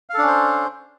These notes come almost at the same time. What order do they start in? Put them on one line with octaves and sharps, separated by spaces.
F5 A4 D4 C#4 C5